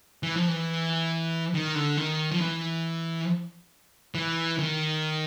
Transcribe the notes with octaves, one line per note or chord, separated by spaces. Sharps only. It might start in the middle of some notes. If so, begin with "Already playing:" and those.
E3
F3
E3
D#3
D3
D#3
F3
E3
E3
D#3